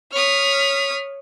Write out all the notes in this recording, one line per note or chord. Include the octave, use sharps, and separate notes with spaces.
C#5 D#6 F6 B6